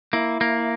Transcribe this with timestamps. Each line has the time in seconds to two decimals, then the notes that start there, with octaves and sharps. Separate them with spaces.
0.13 A#3 E4
0.41 A#3